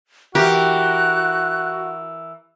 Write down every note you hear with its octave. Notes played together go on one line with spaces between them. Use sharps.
E3 F#4 G4 A#4 F#6